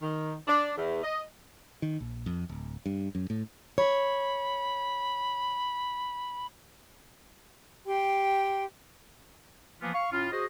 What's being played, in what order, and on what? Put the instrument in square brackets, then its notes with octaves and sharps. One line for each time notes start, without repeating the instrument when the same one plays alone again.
[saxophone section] D#3
D4
E2
D#5
[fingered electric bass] D#3
A#1
F2
D1
G2
F#2
A2
[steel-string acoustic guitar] C#5 [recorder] B5
[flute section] G4 G5 C6
[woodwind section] E3 F3 A#3 B3 F4
F5 C#6
A2 C#4 F4
F#4 G#4 C5 D#5